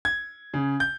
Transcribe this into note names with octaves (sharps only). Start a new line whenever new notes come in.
G#6
C#3
G6